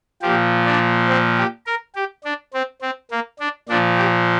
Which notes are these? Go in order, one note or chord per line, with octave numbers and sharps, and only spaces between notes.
A#2 F3 G4
D4
C4
G4
A#4
G4
D4
C4
C4
A#3
D4
A#2 F3 D4
G4